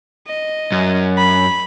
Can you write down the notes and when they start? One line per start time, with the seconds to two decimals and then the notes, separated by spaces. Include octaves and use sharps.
0.27 D#5
0.72 F#2
1.17 B5